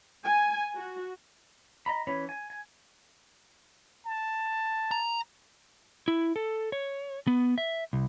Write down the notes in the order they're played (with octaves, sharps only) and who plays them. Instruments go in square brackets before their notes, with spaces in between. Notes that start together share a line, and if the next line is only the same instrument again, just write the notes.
[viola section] G#5
F#4
[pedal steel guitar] D#5 A#5 B5
E3 C#4 C#5 B5
G#5
G#5
[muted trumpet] A5
[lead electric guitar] A#5
E4
A4
C#5
B3
E5
C2